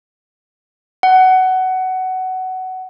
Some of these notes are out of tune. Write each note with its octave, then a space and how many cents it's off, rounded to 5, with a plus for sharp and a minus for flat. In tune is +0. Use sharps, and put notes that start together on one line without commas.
F#5 +15